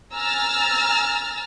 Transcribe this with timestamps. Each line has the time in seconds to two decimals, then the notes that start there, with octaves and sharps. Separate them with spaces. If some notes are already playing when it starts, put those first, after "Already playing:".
0.14 G#5 A#5 E6 F6 A6